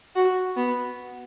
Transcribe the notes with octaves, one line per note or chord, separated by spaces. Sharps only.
F#4
B3